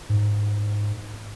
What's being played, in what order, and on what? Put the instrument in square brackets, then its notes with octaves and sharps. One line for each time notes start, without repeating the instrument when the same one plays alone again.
[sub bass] G#2